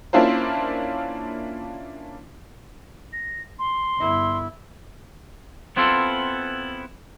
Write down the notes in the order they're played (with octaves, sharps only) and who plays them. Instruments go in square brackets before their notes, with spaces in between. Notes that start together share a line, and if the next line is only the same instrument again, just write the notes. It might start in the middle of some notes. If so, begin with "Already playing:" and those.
[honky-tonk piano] A#3 C#4 D4 E4 F4 C5
[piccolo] A#6
C6
[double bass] G1 E4
[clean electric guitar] B3 C4 E4 F4 A4